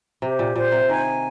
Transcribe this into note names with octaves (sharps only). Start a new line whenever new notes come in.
C3 G4
A#2
A#2 C5
C3
D#3 G#5